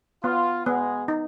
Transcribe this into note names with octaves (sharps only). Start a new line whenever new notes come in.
B3 F4
G#3 B3 G#4
D#4